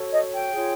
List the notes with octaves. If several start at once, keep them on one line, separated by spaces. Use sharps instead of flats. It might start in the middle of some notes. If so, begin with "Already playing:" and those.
Already playing: F#4 A4 C#5
D#5
G5
F4 G#4 C#5